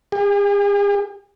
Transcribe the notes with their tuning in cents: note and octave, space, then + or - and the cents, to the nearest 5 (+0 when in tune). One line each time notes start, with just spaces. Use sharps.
G#4 -45